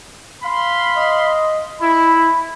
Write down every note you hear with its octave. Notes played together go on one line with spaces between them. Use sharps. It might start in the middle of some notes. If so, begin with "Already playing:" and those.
F5 B5 C6
D#5
E4 B5